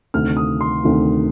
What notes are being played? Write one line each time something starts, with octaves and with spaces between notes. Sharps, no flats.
D2 C3 D#3 F6
D#6
C6
D2 C3 D#3